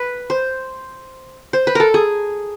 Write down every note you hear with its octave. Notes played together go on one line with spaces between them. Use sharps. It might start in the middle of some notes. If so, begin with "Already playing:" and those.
Already playing: B4
C5
C5
B4
A4 A#4
G#4